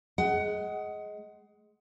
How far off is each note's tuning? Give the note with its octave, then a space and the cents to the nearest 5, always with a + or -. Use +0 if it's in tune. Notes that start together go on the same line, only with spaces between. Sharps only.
G#3 +15 F#5 +25